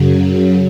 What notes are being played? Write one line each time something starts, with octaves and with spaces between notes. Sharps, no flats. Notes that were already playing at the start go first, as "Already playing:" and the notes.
Already playing: F#2 C#3 F#3